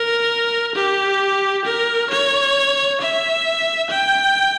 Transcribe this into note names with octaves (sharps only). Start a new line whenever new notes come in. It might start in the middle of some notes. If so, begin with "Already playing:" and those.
Already playing: A#4
G4
A#4
C#5
E5
G5